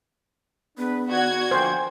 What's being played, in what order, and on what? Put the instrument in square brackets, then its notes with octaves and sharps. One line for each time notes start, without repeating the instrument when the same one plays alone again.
[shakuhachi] B3 [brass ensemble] D4 G#4 B4
[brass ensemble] D#3 D5 F#5 [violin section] F#4 G#6
[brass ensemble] D3 F3 A#3 [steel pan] C5 G5 [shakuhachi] G#5